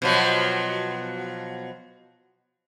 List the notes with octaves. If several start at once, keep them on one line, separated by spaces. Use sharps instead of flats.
B2 F3 F#3